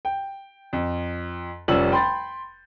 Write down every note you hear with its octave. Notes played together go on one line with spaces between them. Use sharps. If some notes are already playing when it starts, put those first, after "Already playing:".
G5
F2
F1 F3 G3 C#4 E6 F#7
G5 B5 C6 G6 A6